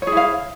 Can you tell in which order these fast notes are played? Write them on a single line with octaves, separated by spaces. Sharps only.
C#5 G#4 E4 F5